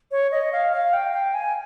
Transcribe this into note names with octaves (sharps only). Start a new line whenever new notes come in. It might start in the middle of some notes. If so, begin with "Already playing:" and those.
C#5
D#5
F5
F5
G5
G5
G#5